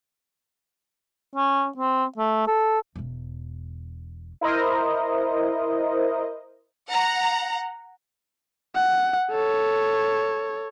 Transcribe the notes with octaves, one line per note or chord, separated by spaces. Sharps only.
C#4
C4
A3
A4
E1 E2
E4 A#4 C5 D#5
F#5 A#5
F#5
A4 C#5